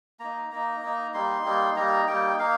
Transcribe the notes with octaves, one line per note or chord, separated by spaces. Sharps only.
A#3 D#4 A#5
A#3 D#4 A#5
A#3 D#4
G3 A#3 D#4 C6
G3 A#3 D#4
G3 A#3 D#4 A#5
G3 A#3 D#4 G5
A#3 D#4 F5